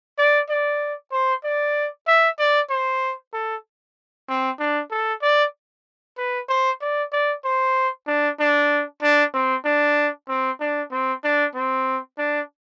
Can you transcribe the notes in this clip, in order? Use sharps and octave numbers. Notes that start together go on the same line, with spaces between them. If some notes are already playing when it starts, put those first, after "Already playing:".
D5
D5
C5
D5
E5
D5
C5
A4
C4
D4
A4
D5
B4
C5
D5
D5
C5
D4
D4
D4
C4
D4
C4
D4
C4
D4
C4
D4